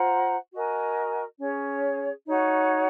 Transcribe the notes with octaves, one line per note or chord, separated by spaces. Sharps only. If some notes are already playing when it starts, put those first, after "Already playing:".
Already playing: F4 C5 F#5 A#5
F#4 A#4 D#5 G#5
C#4 G#4 C#5
D#4 F#4 C#5